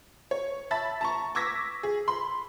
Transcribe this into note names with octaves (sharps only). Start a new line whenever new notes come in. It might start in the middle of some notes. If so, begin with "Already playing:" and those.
C#5
E5 A5 B5 A6
A5 A#5 C#6
C#6 D6 E6 G#6 A#6 B6
G#4
B5 C6